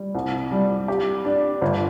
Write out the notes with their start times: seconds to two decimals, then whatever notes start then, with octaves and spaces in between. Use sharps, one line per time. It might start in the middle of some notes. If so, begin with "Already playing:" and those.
Already playing: G3
0.15 C2
0.51 G3
0.88 G4
1.25 D4
1.61 G1